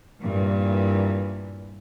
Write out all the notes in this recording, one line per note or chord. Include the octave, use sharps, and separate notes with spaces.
G2 A#2 E3